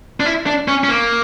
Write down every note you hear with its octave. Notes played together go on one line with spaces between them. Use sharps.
D4
E4
D4
C#4
C#4
A#3